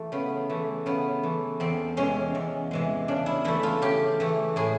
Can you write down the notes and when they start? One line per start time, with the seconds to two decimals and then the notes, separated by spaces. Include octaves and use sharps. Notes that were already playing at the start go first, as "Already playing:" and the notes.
Already playing: E3 A3
0.12 C#3 B3
0.50 E3 A3
0.86 C#3 B3
1.23 E3 A3
1.60 E2 C4
1.97 C3 E3 G#3 C#4
2.35 E2
2.71 C3 E3 G#3
3.08 C#3 D4
3.26 E4
3.44 E3 A3 E4
3.63 F4
3.82 C#3 G4
4.20 E3 A3
4.56 A2 G#4